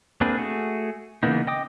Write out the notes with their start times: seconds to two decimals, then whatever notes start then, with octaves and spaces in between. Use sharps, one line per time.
0.21 A#3 C4 D4 G#4 B4
0.37 A3 F#4 G#4
1.23 C#3 E3 A#3 B3 D#4
1.47 D#5 G5 D6 D#6